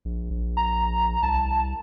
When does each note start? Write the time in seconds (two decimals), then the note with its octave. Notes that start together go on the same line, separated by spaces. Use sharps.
0.05 A#1
0.30 A#1
0.57 A#5
1.23 C2 A5